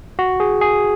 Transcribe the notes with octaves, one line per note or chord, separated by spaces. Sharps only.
F#4
G#4
G#4